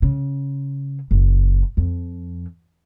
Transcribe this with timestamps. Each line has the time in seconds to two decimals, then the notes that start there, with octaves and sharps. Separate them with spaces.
0.02 C#3
1.11 F#1
1.77 F2